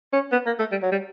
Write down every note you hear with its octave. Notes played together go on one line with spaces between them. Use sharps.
C#4
B3
A#3
A3
G3
F#3
G3